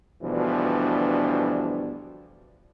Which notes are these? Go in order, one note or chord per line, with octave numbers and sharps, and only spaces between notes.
D2 B2 E3 F3 G3 D4